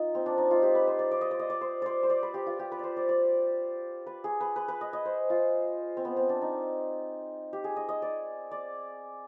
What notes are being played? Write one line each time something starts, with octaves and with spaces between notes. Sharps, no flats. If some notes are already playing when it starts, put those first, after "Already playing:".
Already playing: D#4 F4
C4
D4
D#4
F4
G4
B4
C5
D5
D5
D#5
D5
D#5
D5
C5
C5 D5
C5
D5
B4
G4
F4
G4
B4
C5 D5
D5
D5
B4
G#4
B4
B4
B4
D#5
D#5
C5
F4
C4
B3
C4
D4
D#4
G4
G#4
D#5
D#5
D5
D5